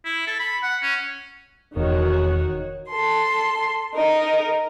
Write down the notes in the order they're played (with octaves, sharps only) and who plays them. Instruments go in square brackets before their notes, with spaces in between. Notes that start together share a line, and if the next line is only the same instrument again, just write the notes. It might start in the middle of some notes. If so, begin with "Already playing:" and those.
[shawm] E4
A4
B5
F#5
C#4
[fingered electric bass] E1 [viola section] D#3 F#4 C#5
[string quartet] A4 C6
D#4 A#4